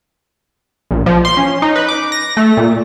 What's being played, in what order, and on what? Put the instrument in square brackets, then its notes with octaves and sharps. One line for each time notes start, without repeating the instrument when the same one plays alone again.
[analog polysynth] A#1
F3
C6
C#4
D#4
B4
D6
A#6
A3
A#2